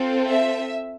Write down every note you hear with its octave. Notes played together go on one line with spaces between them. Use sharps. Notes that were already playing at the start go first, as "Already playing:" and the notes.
Already playing: C4 F4 A4
E5